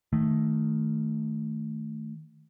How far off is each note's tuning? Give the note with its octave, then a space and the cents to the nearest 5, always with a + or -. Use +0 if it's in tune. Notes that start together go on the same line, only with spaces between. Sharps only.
D#3 +0 A3 +0